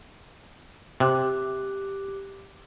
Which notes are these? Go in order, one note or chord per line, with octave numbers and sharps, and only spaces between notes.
C3 G4 D6 F#6